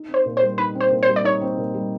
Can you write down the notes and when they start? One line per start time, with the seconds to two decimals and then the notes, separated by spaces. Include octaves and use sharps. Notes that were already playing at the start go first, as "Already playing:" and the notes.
Already playing: D#4
0.08 C4
0.14 C5
0.26 A#2
0.37 C5
0.42 G3
0.58 D#4 B4
0.75 C4
0.80 C5
0.91 A#2
1.03 C5
1.09 G3
1.16 D5
1.24 D#4 C#5
1.41 C4
1.58 A#2
1.74 G3